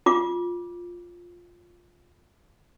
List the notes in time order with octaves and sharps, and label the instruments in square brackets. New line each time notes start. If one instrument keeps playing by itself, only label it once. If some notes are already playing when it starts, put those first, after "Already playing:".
[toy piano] F4 D6